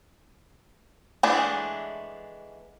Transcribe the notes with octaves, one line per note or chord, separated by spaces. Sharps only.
E3 G#3 A3 B3 D4